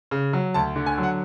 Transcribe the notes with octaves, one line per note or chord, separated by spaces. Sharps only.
C#3
F#3
D2 A5
D3
G#5
F#3
F#5